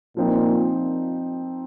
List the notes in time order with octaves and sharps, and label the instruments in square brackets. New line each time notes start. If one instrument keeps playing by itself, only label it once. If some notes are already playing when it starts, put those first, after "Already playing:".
[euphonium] A#2 [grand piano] F3 C4 D#4